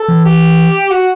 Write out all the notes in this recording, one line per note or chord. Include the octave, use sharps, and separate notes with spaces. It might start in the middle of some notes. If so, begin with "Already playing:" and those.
Already playing: A4
E3
G4
F#4